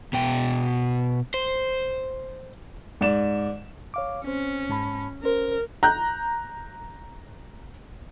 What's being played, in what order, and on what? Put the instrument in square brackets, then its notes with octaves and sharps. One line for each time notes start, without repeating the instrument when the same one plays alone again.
[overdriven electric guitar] B2 G5
C5
[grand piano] G#2 D5 E7
[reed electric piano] C#5 F5 D6
[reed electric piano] C4 C5 [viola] C#4
[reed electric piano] G#2 A5 B5
[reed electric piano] C#4 C5 [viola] A#4
[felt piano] A#5 F#6 G6